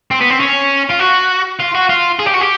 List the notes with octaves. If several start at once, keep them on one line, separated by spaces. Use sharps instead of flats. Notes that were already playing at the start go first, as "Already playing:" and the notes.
C4
B3
C4
C#4
F4
F#4
F4
F#4
F4
G#4
G4
F#4
G4